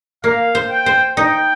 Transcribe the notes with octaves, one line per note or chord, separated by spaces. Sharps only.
A#3 F5
C5
G5
C5
D#4 G5